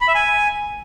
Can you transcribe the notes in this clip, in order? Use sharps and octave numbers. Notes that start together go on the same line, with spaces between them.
B5
E5
G#5